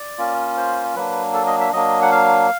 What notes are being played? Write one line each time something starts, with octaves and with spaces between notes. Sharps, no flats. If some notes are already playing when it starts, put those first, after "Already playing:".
Already playing: D5
A#3 C#4 F4
C5
F#3 A#3 D4 B4
A4
D#5
E5
F#3 A#3 D4 D#5
F#5
F5